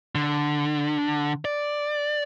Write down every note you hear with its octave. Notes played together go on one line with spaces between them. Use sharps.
D3
D5